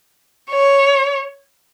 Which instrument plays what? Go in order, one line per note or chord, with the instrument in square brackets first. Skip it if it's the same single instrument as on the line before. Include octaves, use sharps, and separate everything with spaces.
[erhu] C#5